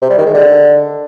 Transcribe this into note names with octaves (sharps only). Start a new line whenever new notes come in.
C3
G3
D#3
G#3
D3